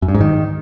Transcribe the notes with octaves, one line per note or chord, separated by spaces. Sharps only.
F#2
G2
G#2
D#3